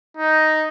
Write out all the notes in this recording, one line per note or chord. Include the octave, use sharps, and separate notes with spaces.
D#4